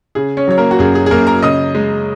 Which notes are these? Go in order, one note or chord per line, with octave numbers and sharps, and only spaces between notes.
C#3 G#4
C#4 C#5
F#3 C#5
A#3 A#4
F#4
F#2 G#4
G#4
G#4
F#2 A#3 A#4
A#4 A#5
C#3 D#5 D#6
G#3